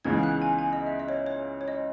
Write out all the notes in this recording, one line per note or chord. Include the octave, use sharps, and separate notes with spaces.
C#2 C#3 E3 B3 D#4 G#6
F#6
G#5
G#5
D#5
E5
D#5
C#5
C#5
C#5
D#5